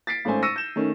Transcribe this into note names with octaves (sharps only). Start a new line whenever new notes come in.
A6 B6 C7 D7
G#1 A3 C#4 C5 G#5
C#6 E6 A#6 C#7 D#7
G6 E7
D#3 A3 C#4